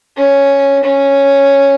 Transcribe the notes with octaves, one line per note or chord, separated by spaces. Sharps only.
C#4
C#4